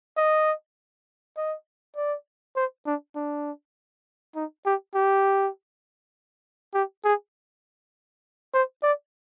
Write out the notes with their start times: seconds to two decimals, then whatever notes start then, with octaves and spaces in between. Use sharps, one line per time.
0.17 D#5
1.37 D#5
1.97 D5
2.56 C5
2.86 D4
3.16 D4
4.35 D#4
4.66 G4
4.95 G4
6.74 G4
7.04 G#4
8.54 C5
8.83 D5